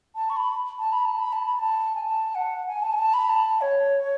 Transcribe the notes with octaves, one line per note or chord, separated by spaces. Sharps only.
A5
C#6
B5
A5
B5
A5
B5
A5
B5
A5
G#5
A5
F#5
G#5
A5
G#5
A5
B5
A5
C#5